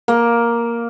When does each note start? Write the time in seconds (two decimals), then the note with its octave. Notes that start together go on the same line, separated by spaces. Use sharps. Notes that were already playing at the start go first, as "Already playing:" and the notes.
0.08 A#3